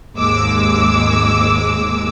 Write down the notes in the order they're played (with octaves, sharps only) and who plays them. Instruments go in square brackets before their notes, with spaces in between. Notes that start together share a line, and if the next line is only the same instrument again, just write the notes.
[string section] G#1 D#2 G#2 G#3 D6 E6